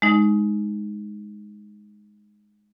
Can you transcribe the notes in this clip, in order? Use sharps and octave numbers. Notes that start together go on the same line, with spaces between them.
G#3 D#4